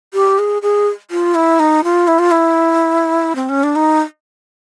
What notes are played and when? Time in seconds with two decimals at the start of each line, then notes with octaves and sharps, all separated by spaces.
0.14 G4
0.39 G#4
0.62 G#4
1.11 F4
1.35 E4
1.60 D#4
1.84 F4
2.08 E4
2.19 F4
2.31 E4
3.35 C4
3.49 C#4
3.63 D4
3.76 D#4